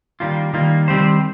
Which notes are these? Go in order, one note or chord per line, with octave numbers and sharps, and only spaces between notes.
D#3 G3 A#3 F4
D#3 G3 A#3 F4
D#3 G3 C4 G4 C5